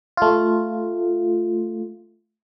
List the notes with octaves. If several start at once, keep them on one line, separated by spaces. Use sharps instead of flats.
A3 F4